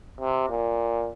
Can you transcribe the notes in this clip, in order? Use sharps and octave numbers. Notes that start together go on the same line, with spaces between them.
C3
A#2